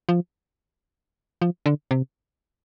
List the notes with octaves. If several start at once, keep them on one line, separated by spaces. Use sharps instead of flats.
F3
F3
D3
C3